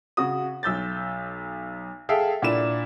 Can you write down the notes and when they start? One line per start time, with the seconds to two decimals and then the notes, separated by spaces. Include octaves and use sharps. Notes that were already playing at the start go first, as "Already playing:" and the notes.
0.17 C#3 F#4 D#6
0.63 B1 E6 G6 A6
2.09 G#4 A4 E5 F5 G5
2.42 A#2 D4 E4 E7